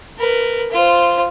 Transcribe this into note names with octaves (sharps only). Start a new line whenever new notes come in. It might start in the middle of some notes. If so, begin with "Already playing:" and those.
A#4 B4
F4 C5